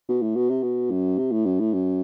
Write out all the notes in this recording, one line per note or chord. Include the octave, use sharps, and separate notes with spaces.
B2
A2
B2
C3
B2
F#2
C3
A2
F#2
A2
F#2